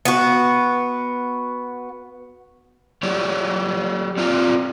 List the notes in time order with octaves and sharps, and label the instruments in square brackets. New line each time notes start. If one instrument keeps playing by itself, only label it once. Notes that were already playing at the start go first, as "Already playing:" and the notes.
[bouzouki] B3 F#4
[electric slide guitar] F#3 G4 C#5 D5
C4 F4 D5 A#5